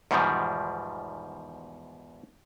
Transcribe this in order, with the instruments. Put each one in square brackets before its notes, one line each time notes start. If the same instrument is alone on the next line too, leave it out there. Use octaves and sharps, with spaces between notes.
[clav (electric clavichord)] E2 G#2 B2 D#3 F3 G3